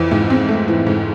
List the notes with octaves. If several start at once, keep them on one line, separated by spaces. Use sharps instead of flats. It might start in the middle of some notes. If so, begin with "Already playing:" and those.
Already playing: F2 E3
G#2
C4
A3
E3
G#2